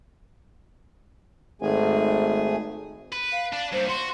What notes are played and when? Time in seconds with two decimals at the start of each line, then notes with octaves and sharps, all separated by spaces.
1.62 G#1 A3 G#4 G#5
3.13 B4
3.32 F5
3.53 D4
3.72 G2 A#2 C5
3.88 F#4 C6